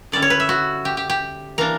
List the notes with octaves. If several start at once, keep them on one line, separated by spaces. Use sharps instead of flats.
D3 G3 C#4 E4 D5
C#5
B4
E5
F#4
G4
G4
G4
E3 A#3 D4 A#4